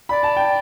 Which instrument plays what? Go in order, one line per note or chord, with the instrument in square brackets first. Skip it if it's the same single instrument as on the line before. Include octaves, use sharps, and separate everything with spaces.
[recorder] D5 [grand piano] B5
[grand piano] A5
G5